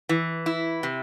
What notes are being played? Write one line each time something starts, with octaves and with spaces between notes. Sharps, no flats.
E3
E4
C3